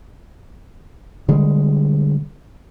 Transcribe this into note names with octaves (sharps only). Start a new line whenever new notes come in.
B2 D3 G3 G#3